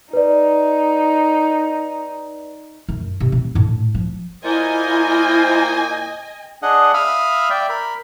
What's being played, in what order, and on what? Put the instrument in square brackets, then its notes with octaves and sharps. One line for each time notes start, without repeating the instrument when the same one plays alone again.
[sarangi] D#4 [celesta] B4 D5
[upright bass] F#2
C3
C4
A2 D4
F3
[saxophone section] A#2 A#3 C5 [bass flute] E4 [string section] D#5 G#5
[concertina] D4 G#4 D#5 F#5
E5 F5 B5 D#6 F6
D5 E5 G5
A#4 B5